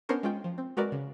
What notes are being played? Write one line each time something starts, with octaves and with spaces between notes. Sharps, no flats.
B3 C#4 D4 A#4 C5 C#5
G#3 C#4 F4 G5
F3
C4
G#3 F#4 A#4 B4 D5
C#3